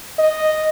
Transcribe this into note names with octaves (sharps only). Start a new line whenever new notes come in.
D#5